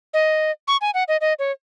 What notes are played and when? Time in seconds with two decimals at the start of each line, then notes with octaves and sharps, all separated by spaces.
0.14 D#5
0.68 C#6
0.81 G#5
0.94 F#5
1.08 D#5
1.21 D#5
1.39 C#5